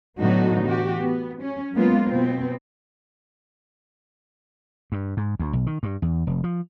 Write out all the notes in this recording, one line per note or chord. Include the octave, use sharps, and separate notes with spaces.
A2 D3 F#3 B3 D#4 F#4
E3 F#4 G4
B3
C#4
F#3 G#3 A#3 B3 F4
B2 B3 C4
G2
G#2
D2
B1
D#3
G2
E2
F1
F3